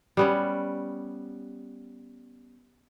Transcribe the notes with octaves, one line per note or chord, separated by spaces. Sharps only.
G3 B3 C#4